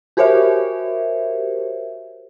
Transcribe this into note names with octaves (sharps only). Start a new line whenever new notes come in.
F#4 G4 A#4 C5 C#5 E5